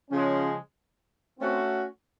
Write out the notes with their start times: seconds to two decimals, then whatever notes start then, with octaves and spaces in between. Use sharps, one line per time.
0.11 C#3 F3 G#3 C#4
1.39 A3 C4 C#4 F#4